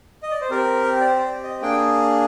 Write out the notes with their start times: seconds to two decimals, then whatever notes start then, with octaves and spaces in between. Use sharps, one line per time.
0.23 D#5
0.31 D5
0.41 C5
0.50 C4 G4 A#4
1.01 D5
1.05 C5
1.16 C5
1.25 D5
1.43 D#5
1.62 A#3 D4 G#4 G5